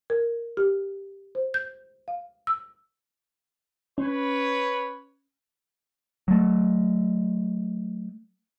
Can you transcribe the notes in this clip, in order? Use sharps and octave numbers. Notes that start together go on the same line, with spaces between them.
A#4
G4
C5
G6
F5
E6
C#4 B4 C#5
F#3 A3